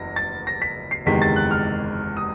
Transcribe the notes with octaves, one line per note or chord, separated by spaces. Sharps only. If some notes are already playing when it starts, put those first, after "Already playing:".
Already playing: F#1 E2 A#6
A6
A#6
B6
C7
F#1 E2 C3 D#3 G#3 B6
A6
F#6
F6
D#6